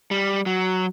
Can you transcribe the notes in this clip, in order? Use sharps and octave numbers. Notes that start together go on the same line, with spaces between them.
G3
F#3